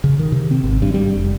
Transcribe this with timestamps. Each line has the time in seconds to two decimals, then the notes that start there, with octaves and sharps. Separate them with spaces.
0.04 C#3
0.19 D#3
0.32 C3
0.51 C4
0.64 G#1
0.82 G2
0.94 G3
1.15 F1